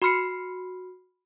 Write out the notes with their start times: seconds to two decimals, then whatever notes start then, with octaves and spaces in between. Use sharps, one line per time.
0.02 F#4 B5 C6 F6 C7 C#7